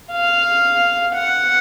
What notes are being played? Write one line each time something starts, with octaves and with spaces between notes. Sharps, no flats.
F5
F#5